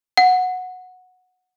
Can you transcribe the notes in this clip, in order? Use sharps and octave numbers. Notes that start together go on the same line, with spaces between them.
F#5